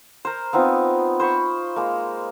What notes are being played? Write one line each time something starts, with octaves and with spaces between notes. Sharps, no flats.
A#4 C5
B3 C4 D#4 F4
C5 B5 C#6
G#3 A#3